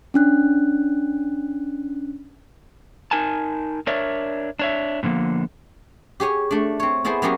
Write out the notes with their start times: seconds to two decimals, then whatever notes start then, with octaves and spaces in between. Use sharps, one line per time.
0.14 C#4 D4 F#6
3.11 D#4 A#4 G#5 A5
3.87 D4 A#4 C#5 D5 E5
4.59 D4 C#5 E5
5.03 A2 D3 F3 A#3 B3
6.20 G4 G#4 C#5 G#5
6.51 A3 D4
6.80 C4 C#5
7.05 B3 E4 G#4 A4 C5
7.22 F#3 A#3 B3 C#4 G4 G#4